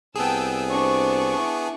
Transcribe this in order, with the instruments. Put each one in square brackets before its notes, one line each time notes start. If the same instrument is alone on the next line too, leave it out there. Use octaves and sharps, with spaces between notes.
[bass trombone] C2 [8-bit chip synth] B3 G#4 [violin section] G5 A5 E6
[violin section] D4 C#6 [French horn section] C5
[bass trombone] E4